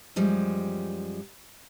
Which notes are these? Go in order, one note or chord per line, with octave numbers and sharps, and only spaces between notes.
F#2 F3 G3 G#3